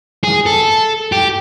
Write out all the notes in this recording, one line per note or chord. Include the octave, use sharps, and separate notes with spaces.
G#4
A4
G4